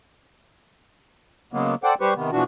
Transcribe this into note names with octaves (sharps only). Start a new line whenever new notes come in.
C#3 F#3 G#3 A#3 B3
A4 C5 D5 F#5 G5
G3 G4 B4 C5 C#6
C3 D#3 B3
B2 E3 F3 D4 F#4